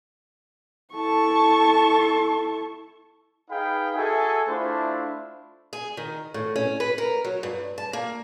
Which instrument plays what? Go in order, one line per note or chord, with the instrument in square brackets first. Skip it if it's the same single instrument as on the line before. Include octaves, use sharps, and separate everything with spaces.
[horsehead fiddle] E4 A4 [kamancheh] A5 C#6
[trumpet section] D#4 G#4 B4 F5 G5 B5
F#4 G#4 A4 E5 G#5
A3 D4 E4 F4 C5
[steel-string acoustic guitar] G#4
D#3
A2
C#4
B4
A#4
F#3
G2
A5
A#3